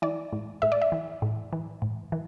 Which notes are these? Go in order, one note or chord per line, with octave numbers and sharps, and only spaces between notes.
E3 D5
A2
A2 E5
D5
E5
E3
A2
E3
A2
E3